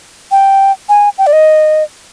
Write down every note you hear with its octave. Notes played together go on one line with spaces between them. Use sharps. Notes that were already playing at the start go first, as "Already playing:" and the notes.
G5
G#5
G5
D5
D#5